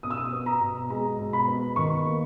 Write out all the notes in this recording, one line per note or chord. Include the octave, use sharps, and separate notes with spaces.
B2 D#6
E6
D#6
B3
A#5
B2
G#3 A#5
B2
B5
B3
D#3 C#6
A#3